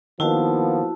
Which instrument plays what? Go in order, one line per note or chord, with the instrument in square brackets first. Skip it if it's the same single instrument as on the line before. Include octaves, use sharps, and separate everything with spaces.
[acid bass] D#3 [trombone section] F3 A#3 B3 [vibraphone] E4 F#4 A5